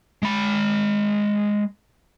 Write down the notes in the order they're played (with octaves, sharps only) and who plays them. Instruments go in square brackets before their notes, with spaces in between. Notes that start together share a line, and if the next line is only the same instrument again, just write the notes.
[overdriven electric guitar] G#3 B5